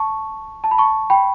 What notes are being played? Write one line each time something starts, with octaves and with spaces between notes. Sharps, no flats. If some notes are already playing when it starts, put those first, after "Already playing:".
Already playing: A5 C#6
A5
B5
A5 C#6
G5 B5